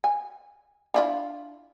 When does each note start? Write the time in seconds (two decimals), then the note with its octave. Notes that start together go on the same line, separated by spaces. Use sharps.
0.04 G#5
0.94 D4 E4 F4